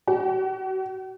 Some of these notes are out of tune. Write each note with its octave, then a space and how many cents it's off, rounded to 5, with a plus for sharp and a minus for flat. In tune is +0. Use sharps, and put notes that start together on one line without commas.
F#4 +40